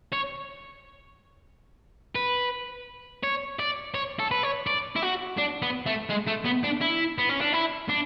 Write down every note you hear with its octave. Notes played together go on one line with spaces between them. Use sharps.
C#5
B4
C#5
D5
C#5
A4
B4
C#5
D5
E4
F#4
D4
B3
A3
G#3
A3
B3
D4
E4
B3
C#4
D4
E4
D4